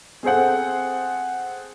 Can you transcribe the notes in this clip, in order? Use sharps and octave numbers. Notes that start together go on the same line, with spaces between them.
C4 G#4 A4 C5 F#5